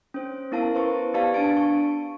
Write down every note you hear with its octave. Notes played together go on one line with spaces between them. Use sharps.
C#4 C5
B3 E4 A#4 F5 A5
B4 C5 C#6
B3 G4 B4 D5 F5 A5
D4 A5 D7
C#6